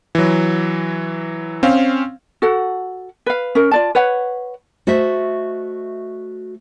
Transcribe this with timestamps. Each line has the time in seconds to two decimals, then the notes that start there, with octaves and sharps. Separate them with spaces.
0.15 E3 F#3
1.63 C4 C#4 F5
2.42 F#4 A4 F#5
3.26 B4 F5
3.55 C#4 A#4
3.71 F4 D5 A5
3.95 B4 C#5 F#5
4.87 A3 F#4 C5 D#5 E5